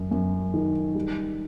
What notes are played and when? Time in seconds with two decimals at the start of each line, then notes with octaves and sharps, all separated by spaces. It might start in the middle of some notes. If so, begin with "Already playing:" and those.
Already playing: F#2
0.11 F#2
0.54 D#3
0.95 G3